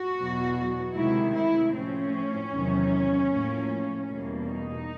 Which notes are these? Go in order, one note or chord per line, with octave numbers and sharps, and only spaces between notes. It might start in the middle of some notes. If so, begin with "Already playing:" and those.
Already playing: F#4
E2 B2 F#3 B3
D2 C3 D#3 G#3 E4
E4
A2 F3 A3 C4 C#4
E2 C3 D#3 F#3
A2 F3 A#3
E2 B2 G3 A#3
D#4